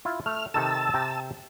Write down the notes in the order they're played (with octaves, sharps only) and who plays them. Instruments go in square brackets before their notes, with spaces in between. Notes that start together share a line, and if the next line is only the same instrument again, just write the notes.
[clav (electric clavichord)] E4 F4
[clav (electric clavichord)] A3 [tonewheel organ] F6
[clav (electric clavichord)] C3 D#3 A4 [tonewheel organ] A5 E6
[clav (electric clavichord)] C3 G5 A#5